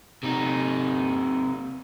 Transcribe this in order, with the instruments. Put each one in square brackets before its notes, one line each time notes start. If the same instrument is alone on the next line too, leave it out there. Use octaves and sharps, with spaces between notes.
[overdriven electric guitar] C3 D#4